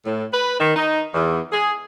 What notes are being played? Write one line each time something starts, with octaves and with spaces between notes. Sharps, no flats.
A2
B4
D#3
D#4
E2
G#4